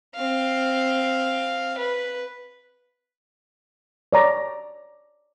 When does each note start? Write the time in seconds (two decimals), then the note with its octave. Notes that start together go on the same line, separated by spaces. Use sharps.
0.15 C4 F5
1.78 B4
4.13 C#5 D5 A#5